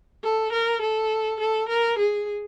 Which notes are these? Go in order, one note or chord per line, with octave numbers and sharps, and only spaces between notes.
A4
A#4
A4
A4
A#4
G#4